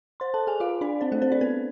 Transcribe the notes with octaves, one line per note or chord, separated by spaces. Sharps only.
C5 C6
A4 A5
G#4 G#5
F4 F5
D4 D5
C4 C5
A3 A4
C4 C5
D4 D5
B3 B4